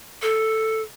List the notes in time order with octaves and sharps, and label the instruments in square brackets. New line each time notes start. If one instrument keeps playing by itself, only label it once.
[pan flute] A4